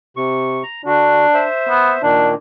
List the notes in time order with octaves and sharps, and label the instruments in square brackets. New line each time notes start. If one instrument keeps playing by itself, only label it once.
[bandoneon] C3 C#6
A#5
[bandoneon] D3 F#4 [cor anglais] D4
[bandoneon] C5 E5
[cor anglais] B3
[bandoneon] A#2 D#3 A#3 [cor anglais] D4